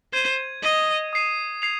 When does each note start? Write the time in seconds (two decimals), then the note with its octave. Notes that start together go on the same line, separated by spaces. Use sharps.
0.13 C5 G#6 D#7
0.63 D#5 D#6 C7 D#7
1.13 D#6 C7 D#7
1.62 G#6 C7 F7